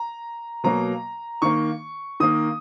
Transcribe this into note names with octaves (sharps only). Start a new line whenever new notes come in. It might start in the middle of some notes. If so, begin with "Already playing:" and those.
Already playing: A#5
B2 F#3 A#3 A#5
D#3 A#3 C#6
D#3 A#3 D#6